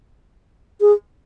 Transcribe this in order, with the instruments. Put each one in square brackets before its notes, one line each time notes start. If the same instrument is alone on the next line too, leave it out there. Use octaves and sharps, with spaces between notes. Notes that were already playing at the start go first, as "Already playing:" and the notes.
[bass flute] G#4